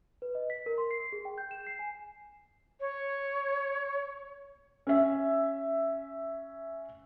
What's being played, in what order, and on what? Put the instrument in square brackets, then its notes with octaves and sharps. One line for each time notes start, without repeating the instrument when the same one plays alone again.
[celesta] B4
D#5
B6
A#4
C6
C7
G#4
G5
G6
E7
C7
G#5
[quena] C#5
[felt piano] C#4 E5